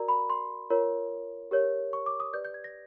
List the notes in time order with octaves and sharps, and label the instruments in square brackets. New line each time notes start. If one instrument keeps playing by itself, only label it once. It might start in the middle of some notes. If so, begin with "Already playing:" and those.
Already playing: [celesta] F#4 A#4 D5 A#5
B5
C6
F4 A#4 C#5
G4 A#4 C#5
C#6
D6
D#6
G4 B4 D5 G6
G6
G#6
A#6